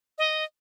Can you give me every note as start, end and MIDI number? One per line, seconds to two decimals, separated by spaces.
0.18 0.44 75